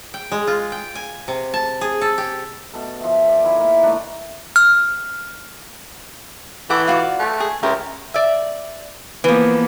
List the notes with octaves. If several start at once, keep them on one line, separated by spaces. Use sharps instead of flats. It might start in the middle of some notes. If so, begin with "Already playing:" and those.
G5
G#3
F4
G5
G#5
C3
A5
G#4
A4
G4
B2 A4
F3 E5
D5
D#3 E4 E5
A#3
A3 D4
F6
E3 A4 F#5 D6
F4 F#4 D5
A3
G#4
C#2 E4 G4 A#4
D5 E5
E3 F3 A#3 B3 B4